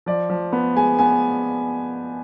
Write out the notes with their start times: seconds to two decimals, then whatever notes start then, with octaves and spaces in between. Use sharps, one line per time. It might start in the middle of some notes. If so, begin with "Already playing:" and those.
0.06 F3 D5
0.30 F3
0.53 B3
0.76 G#3 G#5
0.99 B3 G#5